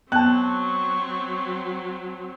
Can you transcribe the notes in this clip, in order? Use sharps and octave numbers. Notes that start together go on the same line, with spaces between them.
F#3 B3 C4 A5 C#6 F#6